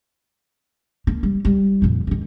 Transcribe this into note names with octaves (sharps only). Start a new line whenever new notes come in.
A#3
G3
G3 E4
F2 A#2
G#2 D#3